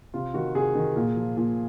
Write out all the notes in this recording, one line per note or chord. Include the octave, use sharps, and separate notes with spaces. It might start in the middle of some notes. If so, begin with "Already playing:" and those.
C3 F4
D#3 F#4
C3 G#4
D#3
A#2
F3
A#2